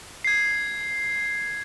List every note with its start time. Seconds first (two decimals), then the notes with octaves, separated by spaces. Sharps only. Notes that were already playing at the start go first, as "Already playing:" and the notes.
0.24 G#6 C7